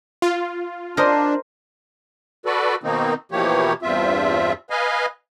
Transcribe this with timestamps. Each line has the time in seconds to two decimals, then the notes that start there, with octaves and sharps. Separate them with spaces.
0.22 F4
0.97 D4 A#4 C5 D#5
2.46 F#4 A4 B4 D5
2.83 B2 D#3 A#3 C4 D#4
3.32 B2 E3 F3 A#3 G4 C#5
3.82 E2 G2 C4 F4 E5
4.70 B4 D#5 F5 G#5